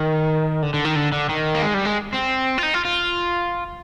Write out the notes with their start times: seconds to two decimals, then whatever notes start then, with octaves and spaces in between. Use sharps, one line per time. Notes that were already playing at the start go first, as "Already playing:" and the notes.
Already playing: D#3
0.62 D3
0.74 D3
0.85 D#3
0.96 D3
1.12 D3
1.29 D#3
1.55 A#3
1.62 G#3
1.74 G3
1.85 G#3
2.13 C4
2.58 F4
2.63 D#4
2.74 F4
2.85 F4